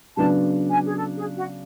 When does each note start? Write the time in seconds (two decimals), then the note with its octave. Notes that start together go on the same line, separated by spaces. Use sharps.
0.17 C#3 F#3 B3 D4 A5
0.70 G#5
0.86 G#4
0.97 A4
1.17 G#4
1.37 F#4